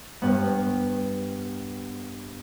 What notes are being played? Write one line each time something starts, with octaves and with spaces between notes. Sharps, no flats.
G2 B3